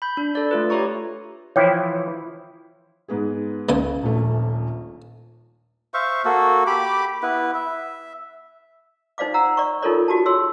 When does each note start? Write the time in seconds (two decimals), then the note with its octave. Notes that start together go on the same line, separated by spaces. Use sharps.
0.02 B5 G6
0.17 D4
0.35 A4 D5
0.51 A3 F4 B4
0.70 G4 C#5 A#5 C#6
1.56 E3 F3 E4 C#5 G5
3.08 G#2 B3 G#4
3.69 C#2 A#2 G#5
4.03 D#1 A#1 A3
5.94 C5 E5 F5 C#6
6.25 A#3 F#4 A4
6.67 G4 B5 D6
7.23 B3 E4 B4
7.55 E5
9.18 D#4 C5 D5 F5 D6
9.34 F#5 A#5 E6
9.57 D5 C#6
9.82 D#4 F4 A4 A#4 C#5 D5
10.08 F#4 G4 A5
10.26 G#4 C#5 C6 E6